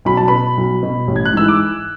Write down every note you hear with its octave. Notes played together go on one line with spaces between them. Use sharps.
B1 B5
A5
B2 B4 B5
B1
B2
A1
G#6
F#6
G#2 E3 E6
D6